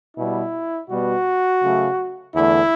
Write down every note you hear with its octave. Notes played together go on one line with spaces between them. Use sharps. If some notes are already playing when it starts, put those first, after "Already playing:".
B2 G3 B3 E4
B2 G3 B3 F#4
C#3 F#3 A3
E2 D3 A3 E4